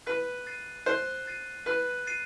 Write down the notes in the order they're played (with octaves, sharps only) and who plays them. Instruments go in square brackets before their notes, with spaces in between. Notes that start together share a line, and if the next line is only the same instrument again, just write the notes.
[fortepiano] B4 [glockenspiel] F#6
[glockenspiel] A6 C7 D#7
[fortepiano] C5 [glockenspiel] F#6
[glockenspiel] A6 C7 D#7
[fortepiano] B4 [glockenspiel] F#6
[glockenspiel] A6 C7 D#7